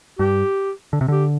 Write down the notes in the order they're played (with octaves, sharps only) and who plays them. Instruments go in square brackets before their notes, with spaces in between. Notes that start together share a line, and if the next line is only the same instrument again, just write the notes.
[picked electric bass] G2 [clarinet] G4
[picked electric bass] D3
C3
[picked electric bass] D3 [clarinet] G4